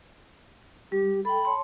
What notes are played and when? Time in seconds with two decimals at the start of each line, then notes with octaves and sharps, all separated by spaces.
0.92 G3 G4
1.25 A4 G5 B5
1.45 C#5 A5 C6